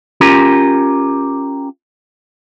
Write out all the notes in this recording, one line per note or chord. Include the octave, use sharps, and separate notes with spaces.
C#4 F4 G4 A#4